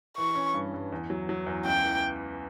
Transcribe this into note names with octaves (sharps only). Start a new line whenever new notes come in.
E3 C#6
C#4
G2
G2
E2
F#3
F#3
E2
C#2 G5
E3